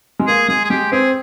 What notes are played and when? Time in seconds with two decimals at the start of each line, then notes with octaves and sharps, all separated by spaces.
0.19 G#3
0.27 A#3 G#4
0.48 G#3 G#4
0.65 G#4
0.70 G#3 G4
0.92 C4 G#4